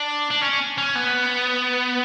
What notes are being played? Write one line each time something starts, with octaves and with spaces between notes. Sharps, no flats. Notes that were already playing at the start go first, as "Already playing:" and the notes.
Already playing: D4
D4
C#4
C#4
B3